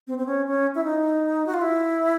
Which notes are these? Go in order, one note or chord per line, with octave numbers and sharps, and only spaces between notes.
C4
C4
C#4
C#4
E4
D#4
F#4
F4
E4